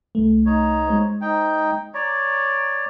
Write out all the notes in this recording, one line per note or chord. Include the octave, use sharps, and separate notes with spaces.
C2 A3
D#4 C#5
G#3 C5
D#4 G5
C#5 D5 A#5